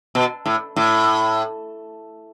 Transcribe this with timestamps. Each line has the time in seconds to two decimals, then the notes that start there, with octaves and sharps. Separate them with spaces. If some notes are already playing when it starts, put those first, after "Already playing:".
0.15 B2
0.46 A2
0.76 A2